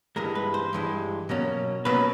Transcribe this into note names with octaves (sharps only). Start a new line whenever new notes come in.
G2 E3 G#3 A#4
B4
C5
G2 E3 G#3
B2 F#3 A#3 C#4
B2 F#3 A#3 C#4 B4